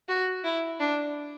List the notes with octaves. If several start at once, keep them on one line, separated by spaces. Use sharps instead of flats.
F#4
E4
D4